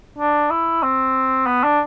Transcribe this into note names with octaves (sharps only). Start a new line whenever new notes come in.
D4
E4
C4
B3
D4